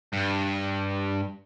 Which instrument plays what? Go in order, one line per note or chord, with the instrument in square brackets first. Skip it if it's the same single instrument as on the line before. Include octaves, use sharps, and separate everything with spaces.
[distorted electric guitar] G2